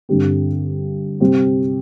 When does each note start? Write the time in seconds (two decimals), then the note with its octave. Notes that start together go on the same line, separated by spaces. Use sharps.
0.09 G2 D3 C4 G4
1.20 C3 G3 C4 G4